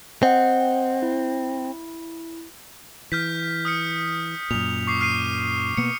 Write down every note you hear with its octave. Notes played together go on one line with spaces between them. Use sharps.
C4 D#5 F#5 G5
E4
E3 F6 G6 B6
D#6 F6 C#7
F#2 A#2 F7
C#6 D6 C7
F6 C7 D#7
B2 A#3 B3 C#7